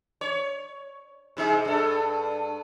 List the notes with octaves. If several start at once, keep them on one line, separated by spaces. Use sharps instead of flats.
C#5
C3 D#4 G#4
G2 A4